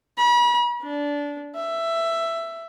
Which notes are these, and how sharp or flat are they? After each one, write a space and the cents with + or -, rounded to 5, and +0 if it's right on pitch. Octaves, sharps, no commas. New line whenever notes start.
B5 -40
D4 -20
E5 +10